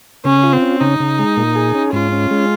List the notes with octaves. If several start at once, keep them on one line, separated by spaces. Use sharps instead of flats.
C#3 C#4
F4
C4
C#4
C#3 D#4
C#3
G#3
A#2
G#4
C#4
G#2 F4
C#4
G#3